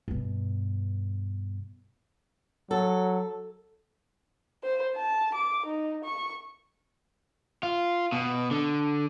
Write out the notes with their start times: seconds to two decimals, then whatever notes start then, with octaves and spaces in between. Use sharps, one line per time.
0.08 G2 B2
2.71 F#3 A4
4.63 C5
4.95 A5
5.34 D6
5.66 D#4
6.04 C#6
7.63 F4
8.12 B2
8.51 D3